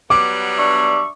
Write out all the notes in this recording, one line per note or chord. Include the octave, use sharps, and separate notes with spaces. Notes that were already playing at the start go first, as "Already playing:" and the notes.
F#3 G3 B3 D6
D4 E5 C#6